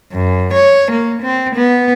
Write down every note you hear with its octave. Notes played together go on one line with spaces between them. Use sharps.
F#2
C#5
A#3
C4
B3